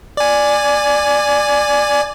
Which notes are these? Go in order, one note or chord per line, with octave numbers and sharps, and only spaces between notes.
D5 G#5